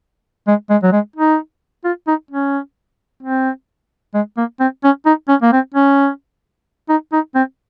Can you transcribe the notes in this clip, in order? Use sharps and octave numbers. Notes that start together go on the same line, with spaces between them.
G#3
G#3
F#3
G#3
D#4
F4
D#4
C#4
C4
G#3
A#3
C4
C#4
D#4
C#4
A#3
C4
C#4
D#4
D#4
C4